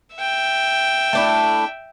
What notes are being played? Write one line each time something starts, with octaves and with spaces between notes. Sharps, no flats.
E5 G5
A3 D4 E4